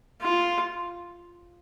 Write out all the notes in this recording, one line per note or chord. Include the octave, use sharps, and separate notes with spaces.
F4